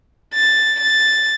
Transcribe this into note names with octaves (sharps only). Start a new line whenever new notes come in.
A6
A6